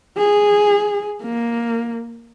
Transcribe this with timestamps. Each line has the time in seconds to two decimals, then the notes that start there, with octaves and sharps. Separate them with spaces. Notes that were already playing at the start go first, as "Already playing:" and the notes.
0.18 G#4
1.23 A#3